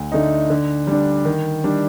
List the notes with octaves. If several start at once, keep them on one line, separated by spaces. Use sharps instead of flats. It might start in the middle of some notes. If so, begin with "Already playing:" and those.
Already playing: D2
D3 A3 D#4
D3
G3 D4
D#3
G3 D4